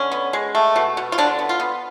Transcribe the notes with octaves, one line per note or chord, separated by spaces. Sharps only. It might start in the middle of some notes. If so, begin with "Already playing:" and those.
Already playing: D3 C#4
B3
G#3
A3
B2
B2
F4
D3 D4
B3
F4
B3